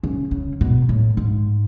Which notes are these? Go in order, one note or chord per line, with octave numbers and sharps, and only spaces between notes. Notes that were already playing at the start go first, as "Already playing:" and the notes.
C#3
C#3
B2
A2
G#2